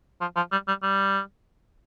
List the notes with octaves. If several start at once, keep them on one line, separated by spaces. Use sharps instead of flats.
F3
F3
G3
G3
G3